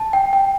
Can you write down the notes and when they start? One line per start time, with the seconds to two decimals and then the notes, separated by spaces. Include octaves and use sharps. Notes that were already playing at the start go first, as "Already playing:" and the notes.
Already playing: A5
0.13 G5
0.33 G5